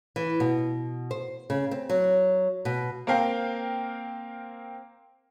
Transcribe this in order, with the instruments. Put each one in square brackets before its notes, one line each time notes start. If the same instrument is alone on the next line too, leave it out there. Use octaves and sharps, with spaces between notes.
[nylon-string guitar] E3
B2
C5
C#3
C4
F#3
B2
[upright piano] A#3 C4 A#4 F5 G5